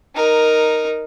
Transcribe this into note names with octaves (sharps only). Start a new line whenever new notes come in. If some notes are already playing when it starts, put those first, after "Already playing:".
D#4 A#4